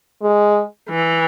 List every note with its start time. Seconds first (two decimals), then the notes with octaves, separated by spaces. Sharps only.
0.22 G#3
0.90 E3